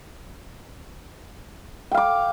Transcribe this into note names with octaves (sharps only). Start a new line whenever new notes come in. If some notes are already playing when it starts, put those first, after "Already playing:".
F5 G5 D6